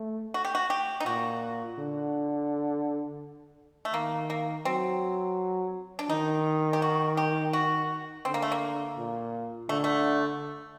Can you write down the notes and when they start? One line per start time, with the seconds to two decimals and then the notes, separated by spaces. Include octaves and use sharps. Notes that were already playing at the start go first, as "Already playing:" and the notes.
Already playing: A3
0.34 F#4
0.45 G4
0.55 F#4
0.70 G4
1.00 D#4
1.06 A#2 F#4
1.78 D3
3.85 A3
3.94 D#3 A#3
4.30 A#3
4.65 F#3 C4
5.99 D4
6.10 D#3 D#4
6.73 G4
6.82 F#4
7.17 G4
7.53 F#4
8.25 D3 C4
8.34 A#3
8.42 A3
8.52 A#3
8.98 A#2
9.69 D3 A3
9.84 A3